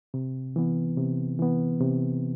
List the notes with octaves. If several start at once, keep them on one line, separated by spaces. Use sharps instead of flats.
C3
E3 B3
C3
E3 B3
C3